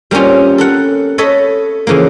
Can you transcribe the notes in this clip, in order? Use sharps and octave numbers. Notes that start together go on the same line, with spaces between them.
G3 A#3 C4 C#4 F4
A4 A#4 F#5
A4 C#5 D#5 E5 A5 B5
C#3 E3 F3 A#3